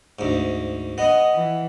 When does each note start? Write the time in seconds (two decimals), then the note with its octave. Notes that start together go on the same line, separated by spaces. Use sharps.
0.19 D2 G#2
0.98 B3 D#5
1.33 E3